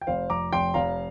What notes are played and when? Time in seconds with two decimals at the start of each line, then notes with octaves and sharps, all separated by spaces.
0.01 G5
0.07 F1 C5 F5
0.30 F2 A#5 D6
0.53 F1 G5 C6
0.74 F1 F5 A#5